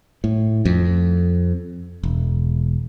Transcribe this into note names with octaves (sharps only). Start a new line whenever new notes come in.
A2
F2
E1